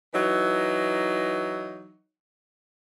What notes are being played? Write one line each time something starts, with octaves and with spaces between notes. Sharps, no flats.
E3 F#3 D#4